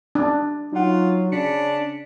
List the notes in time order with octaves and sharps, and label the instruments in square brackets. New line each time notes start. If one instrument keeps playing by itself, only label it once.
[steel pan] D4
[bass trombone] F#3 [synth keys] D#4 F#5 [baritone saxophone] F4
[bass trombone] C#3 [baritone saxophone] D4 [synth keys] B6 C#7